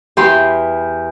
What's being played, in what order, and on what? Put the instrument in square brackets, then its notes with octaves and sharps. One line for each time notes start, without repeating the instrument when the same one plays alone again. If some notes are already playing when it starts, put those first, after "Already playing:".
[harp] E2 G4 B4 G5 C6